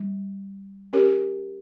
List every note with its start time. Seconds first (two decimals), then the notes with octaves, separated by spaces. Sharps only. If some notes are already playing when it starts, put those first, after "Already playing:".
Already playing: G3
0.93 C#4 G4 A#4 C#5